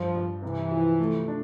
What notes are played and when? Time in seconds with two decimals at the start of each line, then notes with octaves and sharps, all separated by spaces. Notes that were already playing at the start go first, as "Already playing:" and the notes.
Already playing: G2 F3
0.15 G2
0.42 C3 E3
0.71 F3
0.99 A3
1.28 D4